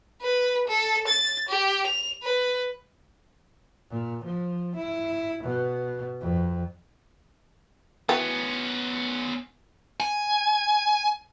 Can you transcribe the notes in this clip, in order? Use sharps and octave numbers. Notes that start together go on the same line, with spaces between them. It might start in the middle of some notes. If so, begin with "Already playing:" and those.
B4
A4
A6
G4
F7
B4
A#2
F3
E4
B2
F2
E3 B3 C#4 F#4 G5
G#5